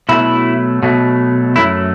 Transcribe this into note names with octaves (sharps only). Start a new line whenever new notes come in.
B2 F#3 A3 E4
B2 F#3 A3
F#2 F#3 A3 E4